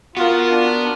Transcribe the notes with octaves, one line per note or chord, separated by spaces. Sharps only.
B3 F4 F#4 A#4
D4